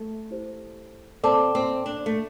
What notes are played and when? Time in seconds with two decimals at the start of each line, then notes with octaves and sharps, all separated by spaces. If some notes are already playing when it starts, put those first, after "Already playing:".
Already playing: A3
0.31 E4 G4 C5
1.23 C4 A4 D5 A5 D6
1.55 C4
1.86 D4
2.06 A3